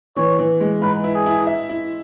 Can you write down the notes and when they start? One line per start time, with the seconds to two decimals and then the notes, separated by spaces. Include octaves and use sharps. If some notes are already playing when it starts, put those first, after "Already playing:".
0.16 E3 C#5
0.39 E3
0.60 G#3
0.82 G#2 B4
1.04 E4
1.15 G#4
1.26 E4
1.47 E5
1.69 E4